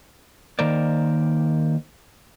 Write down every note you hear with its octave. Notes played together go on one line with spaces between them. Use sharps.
D#3 A#3 A#4 C5 D5